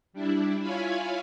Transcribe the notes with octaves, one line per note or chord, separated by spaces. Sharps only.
G3 D4 E4
E4 F4 C#5 F5 G#5 B5